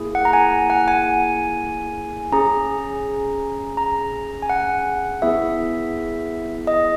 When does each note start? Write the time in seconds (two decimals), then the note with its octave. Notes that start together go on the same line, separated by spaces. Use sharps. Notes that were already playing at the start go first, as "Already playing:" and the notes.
Already playing: A#3 E4 G#4
0.15 F#5
0.25 A#5
0.33 G#5
0.70 F#5
0.88 G#5
2.32 C#4 G#4 A#5
3.77 A#5
4.42 G#5
4.50 F#5
5.22 B3 E4 G#4 E5
6.67 D#5